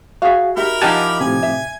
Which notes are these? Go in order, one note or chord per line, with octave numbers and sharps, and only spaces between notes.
F#4 G#4 E5 F5
D#4 G4 A#4 E5 B5
F3 D#4 E4 G4 D#5 F#5 G#5 A5
A2 C3 G#5
E5